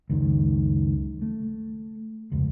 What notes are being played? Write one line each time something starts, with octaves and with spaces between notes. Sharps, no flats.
C#2 F#2 D#3
A3
F1 C#2